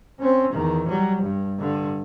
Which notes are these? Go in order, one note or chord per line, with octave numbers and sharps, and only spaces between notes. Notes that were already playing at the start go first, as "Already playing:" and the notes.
C4 C#4
E2 D#3
F#3 G3
G2
G2 D3